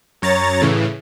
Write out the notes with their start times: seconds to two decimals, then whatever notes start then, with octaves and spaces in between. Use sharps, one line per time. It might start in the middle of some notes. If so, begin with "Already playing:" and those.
0.22 F#2 C#5 A#5 A6
0.61 A2 C#3 E3